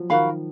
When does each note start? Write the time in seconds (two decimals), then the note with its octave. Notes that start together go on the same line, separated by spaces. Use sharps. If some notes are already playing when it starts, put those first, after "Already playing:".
Already playing: F3 F#3
0.10 D#3 F#4 A#4 F5 B5